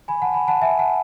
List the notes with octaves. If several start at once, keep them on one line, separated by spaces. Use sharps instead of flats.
G#5 B5
F#5 A5
G#5 B5
F#5 A5
E5 G#5
F#5 A5